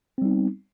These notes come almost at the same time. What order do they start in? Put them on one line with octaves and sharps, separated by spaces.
C4 G3 D#4 B3